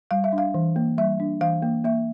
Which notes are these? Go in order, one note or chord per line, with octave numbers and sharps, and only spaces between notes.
G3 F5
E5
D4
F5
E3
A#3
G3 E5
D4
E3 F5
A#3
A#3 E5